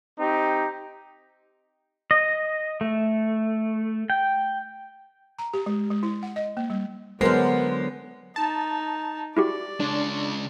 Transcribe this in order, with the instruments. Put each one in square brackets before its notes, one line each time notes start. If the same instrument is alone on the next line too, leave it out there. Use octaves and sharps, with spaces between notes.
[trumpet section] C4 D#4 G4
[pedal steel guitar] D#5
A3
G5
[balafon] A#5
G4
G#3
G#3
E4
F#5
D#5
A#3
G3
[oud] D3 F#3 [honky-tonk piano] G#3 [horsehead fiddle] B3 [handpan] A#4 C5
[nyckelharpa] D#4 [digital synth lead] A5
[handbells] E4 F#4 G4 [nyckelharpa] D5
[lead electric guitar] C#3 G#3 [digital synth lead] D4